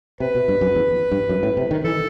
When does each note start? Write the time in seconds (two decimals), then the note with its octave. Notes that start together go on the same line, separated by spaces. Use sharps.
0.20 C3 B4
0.35 B2
0.48 G2
0.61 F#2
0.75 E2
1.12 G2
1.29 F#2
1.43 A2
1.57 C3
1.71 D#3
1.84 E3 A4